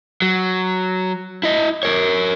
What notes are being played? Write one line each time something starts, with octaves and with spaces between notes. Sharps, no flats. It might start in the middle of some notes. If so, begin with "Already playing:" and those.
F#3
E4 D#5
A#4 C#5